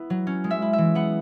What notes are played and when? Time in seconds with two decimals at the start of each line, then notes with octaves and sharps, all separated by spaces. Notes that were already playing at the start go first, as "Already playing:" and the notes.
Already playing: B3 E4
0.10 F#3
0.27 C#4
0.44 G#3
0.51 E5
0.62 E4
0.73 E5
0.78 E3
0.95 B3 F#5